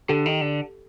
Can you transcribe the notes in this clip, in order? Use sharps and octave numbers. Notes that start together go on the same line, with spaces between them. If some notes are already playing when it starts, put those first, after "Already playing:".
D3 G4 A4
D#3
D3